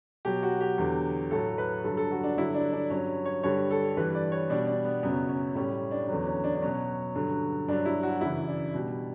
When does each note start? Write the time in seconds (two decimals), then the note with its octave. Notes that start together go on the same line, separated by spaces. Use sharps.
0.25 B2 F#3 G4
0.43 F#4
0.61 G4
0.78 E2 D3 F#3
1.31 A2 F#3 A4
1.58 B4
1.84 G2 D3 F#3 A4
1.97 A4
2.11 F#4
2.23 D4
2.38 G2 D3 F#3 E4
2.54 D4
2.72 D4
2.90 G2 F#3 C#4
3.25 C#5
3.43 G2 D3 G3 C#5
3.71 A4
3.97 G2 E3 G3 B4
4.15 D5
4.32 C#5
4.50 B2 G3 D4
4.67 D4
4.85 B3
5.03 F#2 C#3 F#3 B3
5.29 C#4
5.55 A2 G3 C#4
5.91 D4
6.08 E2 D3 F#3 C#4
6.27 C#4
6.44 D4
6.55 D4
6.62 B2 F#3 C#4
7.15 G2 D3 F#3
7.68 G2 F#3 D4
7.85 E4
8.03 F#4
8.21 F#2 C#3 E3 E4
8.47 D4
8.74 B2 G3